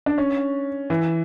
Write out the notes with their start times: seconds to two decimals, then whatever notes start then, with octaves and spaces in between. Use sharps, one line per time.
0.06 D4
0.18 C#4
0.90 E3